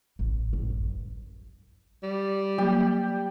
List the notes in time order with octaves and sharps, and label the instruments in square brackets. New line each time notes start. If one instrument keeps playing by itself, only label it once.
[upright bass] A1
A1
F#2
[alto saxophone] G3
[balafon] F#3 A#3 [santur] G4 G5